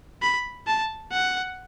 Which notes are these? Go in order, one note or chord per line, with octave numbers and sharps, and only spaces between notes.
B5
A5
F#5